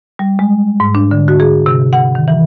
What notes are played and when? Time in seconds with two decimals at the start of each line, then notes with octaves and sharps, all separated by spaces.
0.19 G3
0.39 G#3
0.80 G#2
0.95 D4
1.11 D3
1.28 F#4
1.40 G#4
1.66 C3
1.93 F#5
2.15 D#3
2.28 E3